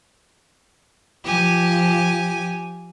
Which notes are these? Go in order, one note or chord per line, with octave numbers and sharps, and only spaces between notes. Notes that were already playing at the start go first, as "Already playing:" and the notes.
F3 G4 G#5